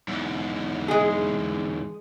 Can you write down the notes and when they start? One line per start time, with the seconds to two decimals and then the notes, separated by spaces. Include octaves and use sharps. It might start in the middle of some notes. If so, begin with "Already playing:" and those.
0.08 E2 G#2
0.88 G#3 G#4